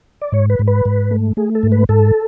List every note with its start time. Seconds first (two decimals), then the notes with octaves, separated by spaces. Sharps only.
0.21 D5
0.32 G#2 C#5
0.50 B4
0.59 G#2
0.68 B4
0.85 G#2
1.11 A3
1.37 A3 G#4
1.55 A4
1.63 G#2
1.72 B4
1.89 G#2 A4